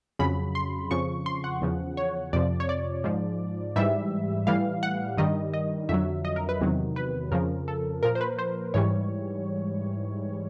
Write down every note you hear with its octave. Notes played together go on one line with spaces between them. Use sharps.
F2 C#3 F#3 B5
C6
F2 C#3 F3 C#6
C6
F#5
E2 C#3 F3
C#5
F2 C3 F3 D5
C#5
D5
G#2 F3
G#2 E3 G3 E5
A2 E3 G3 F5
F#5
G2 D#3 G3 D#5
D#5
F2 D3 F#3 E5
D#5
A#4
B4
E2 C3 D#3 F#3
B4
F2 C#3 F3 A#4
A4
A#2 F3 A#4
C5
B4
C5
G#2 E3 G3 C#5